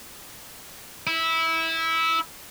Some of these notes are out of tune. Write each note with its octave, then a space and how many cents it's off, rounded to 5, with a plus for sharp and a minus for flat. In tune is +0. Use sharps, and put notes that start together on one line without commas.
E4 -15